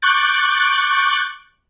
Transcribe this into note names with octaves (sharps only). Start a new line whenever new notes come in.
C#6 D6 F#6 G6 A6 D7